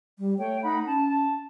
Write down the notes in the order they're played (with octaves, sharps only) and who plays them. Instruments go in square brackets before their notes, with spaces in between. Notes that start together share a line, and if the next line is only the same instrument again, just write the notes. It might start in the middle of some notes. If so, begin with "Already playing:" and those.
[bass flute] G3
[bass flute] A3 [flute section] C#5 G5
[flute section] D#4 F#5 B5
[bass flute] C#4 [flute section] A5
[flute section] A5